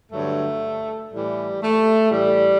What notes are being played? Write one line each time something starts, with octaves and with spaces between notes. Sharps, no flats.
G2 D3 F#3 A3
A2 E3 G3
A3
A2 E3 G3